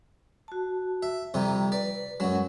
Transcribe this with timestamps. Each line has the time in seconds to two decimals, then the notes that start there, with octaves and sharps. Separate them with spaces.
0.48 F#4 A5
1.03 E5
1.34 F2 C3 G3 G5 A#5
1.72 B4 D5
2.20 F#2 F#3 G#3 C#4 F#5